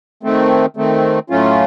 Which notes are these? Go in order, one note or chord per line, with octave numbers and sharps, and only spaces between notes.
D#3 A3 C4
D#3 A3 C4
A2 F#3 A3 C#4 F4